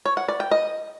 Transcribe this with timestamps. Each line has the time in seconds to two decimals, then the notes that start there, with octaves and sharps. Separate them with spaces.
0.06 C#5
0.17 F#5
0.28 D5
0.40 G5
0.51 D#5